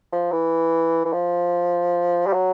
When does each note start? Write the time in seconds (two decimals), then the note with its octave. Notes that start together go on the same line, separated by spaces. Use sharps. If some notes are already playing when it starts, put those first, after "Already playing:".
0.12 F3
0.32 E3
1.05 E3
1.13 F3
2.27 G3
2.33 F#3